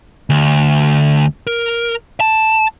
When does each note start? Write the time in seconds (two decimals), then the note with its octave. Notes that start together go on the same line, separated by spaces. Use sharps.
0.30 D2
1.47 A#4
2.20 A5